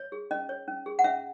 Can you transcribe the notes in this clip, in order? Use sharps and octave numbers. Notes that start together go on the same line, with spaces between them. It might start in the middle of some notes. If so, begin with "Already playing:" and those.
Already playing: C#5
G#4
C#4 D#5
C#5
C#4
G#4
F#5
C#4 E5